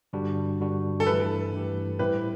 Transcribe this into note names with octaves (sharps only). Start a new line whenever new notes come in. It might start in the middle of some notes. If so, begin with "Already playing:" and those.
G2 D3 G3 D4 F#4
G2 D3 G3 D4 F#4
A4
G2 E3 A3 E4 G4 B4
G2 E3 A3 E4 G4
A2 G3 C4 E4 G4 B4